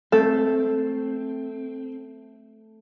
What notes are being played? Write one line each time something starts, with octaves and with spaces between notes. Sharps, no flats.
A3 C4 A4